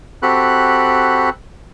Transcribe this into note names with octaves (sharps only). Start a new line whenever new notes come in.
C4 F#4 G4 A4 B5 F#6